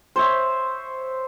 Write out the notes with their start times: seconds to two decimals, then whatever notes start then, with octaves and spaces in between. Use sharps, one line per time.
0.16 C5 C#5 E5